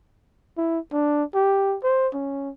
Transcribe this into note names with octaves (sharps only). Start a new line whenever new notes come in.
E4
D4
G4
C5
C#4